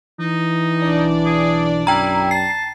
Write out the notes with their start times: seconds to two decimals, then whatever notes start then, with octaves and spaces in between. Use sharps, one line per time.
0.19 E3 D#4
0.82 B1 D4 D5
1.26 G#4
1.87 F#2 E4 G5 A#5
2.31 A5 C7